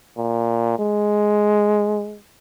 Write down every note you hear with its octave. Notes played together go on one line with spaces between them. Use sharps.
A#2
G#3